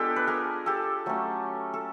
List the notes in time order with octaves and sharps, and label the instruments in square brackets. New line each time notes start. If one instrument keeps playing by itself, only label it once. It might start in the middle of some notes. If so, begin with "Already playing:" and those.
Already playing: [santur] G#3 B3 D4 F4 G4 A4
B4
G#4 A#4
G4 A4
F#3 A3 C#4
A4